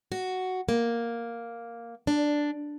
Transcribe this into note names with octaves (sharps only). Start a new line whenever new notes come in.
F#4
A#3
D4